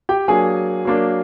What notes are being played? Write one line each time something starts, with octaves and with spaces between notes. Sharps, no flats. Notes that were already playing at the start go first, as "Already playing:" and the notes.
G4 G5
F#3 A#3 D4 G#4 G#5
F#3 A#3 D4